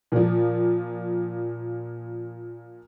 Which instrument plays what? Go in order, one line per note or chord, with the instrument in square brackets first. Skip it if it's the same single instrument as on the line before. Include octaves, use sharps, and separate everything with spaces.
[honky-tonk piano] A#2 F3